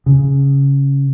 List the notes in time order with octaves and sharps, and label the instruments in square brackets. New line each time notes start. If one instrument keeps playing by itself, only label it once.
[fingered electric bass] C#3